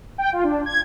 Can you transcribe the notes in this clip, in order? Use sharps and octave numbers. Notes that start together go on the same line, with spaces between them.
G5
F4
D4
G#6